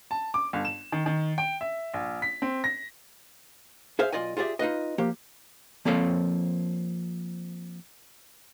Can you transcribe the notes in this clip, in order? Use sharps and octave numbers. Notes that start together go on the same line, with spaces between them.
A5
D6
G1
E7
D#3
D#3
G5
E5
A#1
B6
C4
A#6
G#4 C5 E5 F5
B1 A3 F4 D5 D#5 G#5
F4 G4 G#4 D5 E5
D#4 F4 B4 D#5
F3 A#3 G4
F3 A#3 C4 A4 C#5 F5